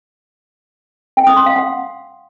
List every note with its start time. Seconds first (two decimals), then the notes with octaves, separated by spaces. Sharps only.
1.17 G5
1.27 D#6
1.37 C6
1.46 F5
1.56 F#5